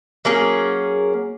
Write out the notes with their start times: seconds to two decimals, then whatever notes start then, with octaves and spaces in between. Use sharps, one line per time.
0.25 F#3 A#3 C#4 G#4